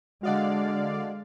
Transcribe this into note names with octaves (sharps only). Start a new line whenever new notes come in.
D3 G#3 F#4 D5 D#5 F5 F#5